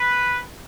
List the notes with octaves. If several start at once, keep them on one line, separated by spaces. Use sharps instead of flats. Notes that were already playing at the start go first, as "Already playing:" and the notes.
Already playing: B4